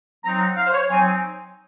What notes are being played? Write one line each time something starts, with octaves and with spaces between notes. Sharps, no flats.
F#3 C4 D#4 A#5
F#5
F5
C5
C#5
F#3 C4 D#4 G#5